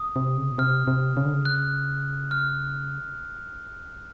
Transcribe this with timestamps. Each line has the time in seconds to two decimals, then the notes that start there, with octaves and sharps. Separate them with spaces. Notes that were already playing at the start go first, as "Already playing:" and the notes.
Already playing: D#6
0.16 C3
0.37 C#3
0.51 B2
0.58 C3 F6
0.87 C3
1.17 C#3
1.25 D3
1.34 C#3
1.45 F#6
2.31 F6